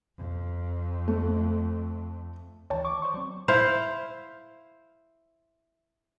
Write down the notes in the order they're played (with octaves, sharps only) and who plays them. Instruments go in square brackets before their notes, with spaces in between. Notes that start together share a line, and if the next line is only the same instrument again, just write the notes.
[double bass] F2
[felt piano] A3
[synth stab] D2 D#3 E3 [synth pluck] C#5 G5 A5
[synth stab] C#6 D6
C5 D5 C#6
F#3 C4
[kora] E4 C5 F5